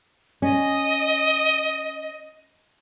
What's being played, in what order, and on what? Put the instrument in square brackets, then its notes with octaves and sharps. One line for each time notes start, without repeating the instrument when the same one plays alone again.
[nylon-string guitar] C#4 [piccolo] D#5